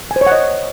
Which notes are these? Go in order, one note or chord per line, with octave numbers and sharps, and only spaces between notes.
G#5
C5
C#5
F#5
D#5